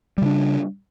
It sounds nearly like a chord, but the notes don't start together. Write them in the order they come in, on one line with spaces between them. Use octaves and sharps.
G3 C#3 D4